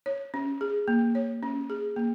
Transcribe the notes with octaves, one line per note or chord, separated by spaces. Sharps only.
C#5
C#4
G#4
A#3
C#5
C#4
G#4
A#3